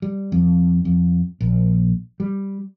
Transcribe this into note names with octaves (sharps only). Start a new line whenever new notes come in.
G3
F2
F2
A#1
G3